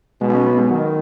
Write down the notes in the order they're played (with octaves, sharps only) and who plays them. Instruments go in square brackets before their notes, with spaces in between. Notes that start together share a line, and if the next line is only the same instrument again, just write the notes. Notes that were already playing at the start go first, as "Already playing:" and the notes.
[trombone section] B1 B2 [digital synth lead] G#3
[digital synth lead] C#4
B3
G#3
[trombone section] D#3 [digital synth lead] F#3